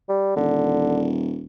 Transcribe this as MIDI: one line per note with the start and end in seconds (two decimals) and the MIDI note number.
0.09 0.32 55
0.36 1.46 27
0.36 1.13 50